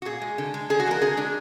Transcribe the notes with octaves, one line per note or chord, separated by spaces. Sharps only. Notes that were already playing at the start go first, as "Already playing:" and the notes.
F#4
A#2 G#4
G#3
D3
G#3
D3 G#4
F#4
F3 G#3 A#4
D3 G#4
G#3 D4